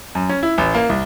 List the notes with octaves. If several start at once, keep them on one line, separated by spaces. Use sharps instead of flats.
F#2
C#4
E4
A1
A#3
C2